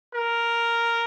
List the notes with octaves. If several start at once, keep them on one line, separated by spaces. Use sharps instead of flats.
A#4